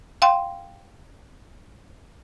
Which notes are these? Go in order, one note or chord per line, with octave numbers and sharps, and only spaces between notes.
F5 G5 C6